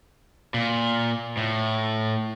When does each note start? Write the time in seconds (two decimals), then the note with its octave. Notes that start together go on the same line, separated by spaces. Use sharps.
0.54 A#2
1.37 A2